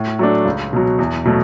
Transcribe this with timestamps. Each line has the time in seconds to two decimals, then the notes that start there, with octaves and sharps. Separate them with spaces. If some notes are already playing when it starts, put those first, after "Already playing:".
Already playing: A2
0.19 F#3 A3 D4
0.45 C#2
0.73 B2 F#3
0.99 E2
1.25 B2 F#3 A3